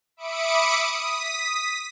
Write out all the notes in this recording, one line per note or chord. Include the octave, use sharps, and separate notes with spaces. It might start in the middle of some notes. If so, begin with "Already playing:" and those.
E5 B5 D6 D#6 C#7 D7
D#6 B6